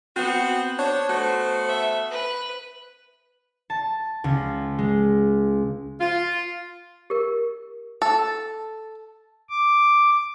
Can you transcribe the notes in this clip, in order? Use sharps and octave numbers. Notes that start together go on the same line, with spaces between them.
B3 C4 F#4
D4 C5 C#5
A3 B3 F#4 C5
E5
B4
A5
C#2
G#3
F4
G4 A#4
A4
D6